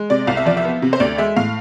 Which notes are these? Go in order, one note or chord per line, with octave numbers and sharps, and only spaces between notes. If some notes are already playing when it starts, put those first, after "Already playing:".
Already playing: G#3
C3 D5
C2 F5
E5
F3 D5
E5
B3
C3
C5
D2 D5
G#3 E5
A2 F5